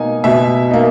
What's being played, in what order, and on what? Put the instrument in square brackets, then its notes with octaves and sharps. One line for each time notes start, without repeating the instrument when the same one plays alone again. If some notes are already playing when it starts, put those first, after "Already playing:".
Already playing: [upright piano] B2 A#3 D#4 G#5
B2 E5
A#3 D#4